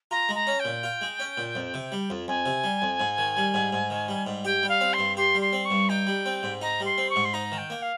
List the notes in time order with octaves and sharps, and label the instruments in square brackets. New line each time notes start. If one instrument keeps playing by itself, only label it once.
[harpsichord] F4 [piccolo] A#5
[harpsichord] G#3
[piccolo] A#5
[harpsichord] C#4
[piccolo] G5
[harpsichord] A#2
F4
G#3
C#4
A#2
F2
C3
G3
F2
[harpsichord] F2 [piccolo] G#5
[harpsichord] C3
G3
F2
G#2
D#3
G3
G#2
G#2
D#3
G3
G#2
[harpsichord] G4 [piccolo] G5
[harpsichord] G3
[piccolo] F5
[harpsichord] C4
[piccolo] C6
[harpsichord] G2
[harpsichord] G4 [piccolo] C6
[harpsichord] G3
[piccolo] C6
[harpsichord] C4
[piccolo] C#6
[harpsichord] G2
[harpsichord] D#4 [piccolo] G5
[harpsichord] G3
C4
G#2
[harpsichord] D#4 [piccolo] A#5
[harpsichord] G3
[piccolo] C6
[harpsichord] C4
[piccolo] C#6
[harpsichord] G#2
[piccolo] C6
[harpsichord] D#4 [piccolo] A#5
[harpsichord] D#3
[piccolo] G5
[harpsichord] A#3
[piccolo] F5